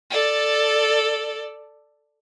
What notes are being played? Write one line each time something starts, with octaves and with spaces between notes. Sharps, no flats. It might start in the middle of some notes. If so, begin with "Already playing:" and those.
A4 D5